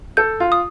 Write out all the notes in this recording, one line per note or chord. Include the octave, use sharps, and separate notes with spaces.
A4 G6
F4
D#6